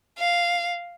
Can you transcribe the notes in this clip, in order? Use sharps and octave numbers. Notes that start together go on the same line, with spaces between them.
F5